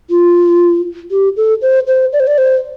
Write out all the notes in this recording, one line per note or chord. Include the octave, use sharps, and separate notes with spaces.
F4
G4
A4
C5
C5
D5
C5
D5
C5